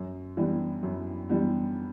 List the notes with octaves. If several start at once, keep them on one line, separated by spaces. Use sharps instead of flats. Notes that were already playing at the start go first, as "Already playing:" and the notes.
Already playing: F#2
E3 G3 B3 D4
F#2
E3 G3 B3 D4